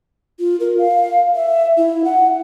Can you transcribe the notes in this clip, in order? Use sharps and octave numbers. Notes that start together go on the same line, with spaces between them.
F4
A#4
F5
E5
E4
F#5